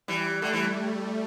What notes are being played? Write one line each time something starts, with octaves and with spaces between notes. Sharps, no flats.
E3 G3
D3 A3
E3